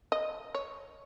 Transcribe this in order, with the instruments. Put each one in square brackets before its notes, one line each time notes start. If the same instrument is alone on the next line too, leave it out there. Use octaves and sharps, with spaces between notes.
[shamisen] D#5
C#5